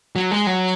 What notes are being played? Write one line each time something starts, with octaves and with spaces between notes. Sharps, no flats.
F#3
G#3
F#3